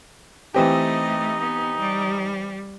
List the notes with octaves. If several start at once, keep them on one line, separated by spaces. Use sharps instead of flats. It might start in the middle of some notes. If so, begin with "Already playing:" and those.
E3 A3 C4 D#4 G4 D#5
B3
G3